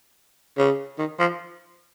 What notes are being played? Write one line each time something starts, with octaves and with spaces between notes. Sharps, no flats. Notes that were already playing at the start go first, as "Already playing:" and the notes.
C#3
D#3
F3